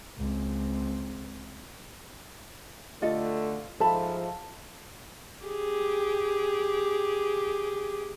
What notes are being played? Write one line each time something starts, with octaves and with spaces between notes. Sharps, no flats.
C#2 C4
D2 D3 A3 F4 A4 D5 D#5
G#2 F3 A4 E5 F5 A5 B5
G4 G#4